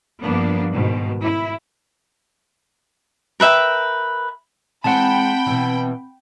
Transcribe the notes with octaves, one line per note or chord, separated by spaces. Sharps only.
G2 F3 A#3 B3 D4
G#2 B2 D#3
E4
A#4 B4 E5 G5
E3 G#3 C4 C5 F#5 G5 A5 B5
B2 E3